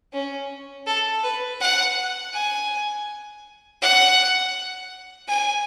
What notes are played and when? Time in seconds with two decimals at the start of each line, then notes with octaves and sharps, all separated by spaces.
0.13 C#4
0.86 A4
1.24 B4
1.60 F#5
2.34 G#5
3.82 F#5
5.28 G#5